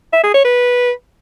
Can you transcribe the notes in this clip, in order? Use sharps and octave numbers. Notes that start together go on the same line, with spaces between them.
E5
G#4
C#5
B4